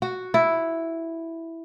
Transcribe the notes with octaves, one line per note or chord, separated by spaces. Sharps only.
F#4
E4